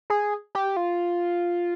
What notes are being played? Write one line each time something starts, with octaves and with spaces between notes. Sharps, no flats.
G#4
G4
F4